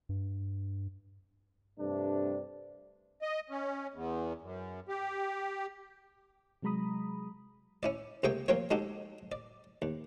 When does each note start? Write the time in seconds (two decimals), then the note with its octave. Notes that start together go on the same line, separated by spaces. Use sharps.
0.09 G2
1.80 G2 C3 A3 D4
3.22 D#5
3.50 C#4
3.94 E2
4.42 F#2
4.89 G4
6.62 C3 F#3 G#3 A#5 B5 D#6
7.83 C#4 E4 D5
8.23 C#2 C3 A#3 G#4 G5 C#6
8.48 F3 A#3 C4 F4 C#5
8.71 G#3 D#4 F#4 G4 A4
9.32 D5
9.82 D#2